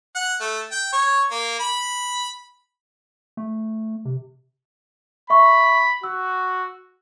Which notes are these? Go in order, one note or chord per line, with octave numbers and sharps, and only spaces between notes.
F#5
A3
G5
C#5
A#3
B5
A3
C3
E5 B5 C#6
F#4 E6